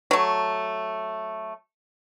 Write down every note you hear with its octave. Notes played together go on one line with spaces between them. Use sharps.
F#3 A3